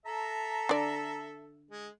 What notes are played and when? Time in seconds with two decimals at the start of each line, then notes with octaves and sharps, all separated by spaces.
0.06 A4 E5 A5 A#5
0.69 D3 D5
1.70 G#3